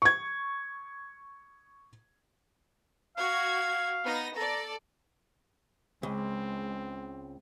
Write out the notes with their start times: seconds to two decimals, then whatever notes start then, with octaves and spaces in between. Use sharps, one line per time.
0.02 C#6 G#6
3.17 F#4 F5 G#6
4.04 B3 D#4 A#6
4.36 A4 D5 A#5
6.03 C#2 G#3 C4